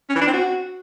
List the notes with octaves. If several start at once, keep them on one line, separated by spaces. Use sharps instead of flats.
C#4
E3
D4
C4
F#4